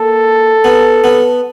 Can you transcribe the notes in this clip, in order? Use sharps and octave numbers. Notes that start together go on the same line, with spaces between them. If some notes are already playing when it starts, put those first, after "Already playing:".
Already playing: A#3 A4
B3
B3